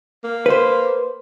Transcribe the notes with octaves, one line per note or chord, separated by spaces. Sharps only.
A#3
B4 C5